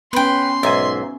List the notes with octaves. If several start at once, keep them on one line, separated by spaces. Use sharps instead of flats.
B3 C#4 B4 G5 C6
B1 G#2 E5 G#5